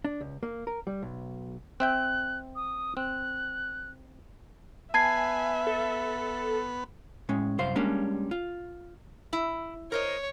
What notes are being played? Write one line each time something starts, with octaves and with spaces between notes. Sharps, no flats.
D4
C#2
A#3
A#4
G3
B1
C4 E5 G5 F#6
D#6
C4 F#6
B3 E5 G#5 A5 G#6 C7
A4
A2 G#3 C#4
C2 F#2 C5 F5
G3 G#3 A#3 C#4 D4
F4
E4
A#4 C5 C#5 D#5